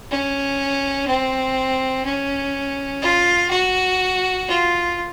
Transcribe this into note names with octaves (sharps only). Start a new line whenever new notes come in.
C#4
C4
C#4
F4
F#4
F4